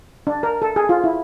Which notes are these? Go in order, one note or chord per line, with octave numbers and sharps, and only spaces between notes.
D4
A#4
A4
G#4
F4
E4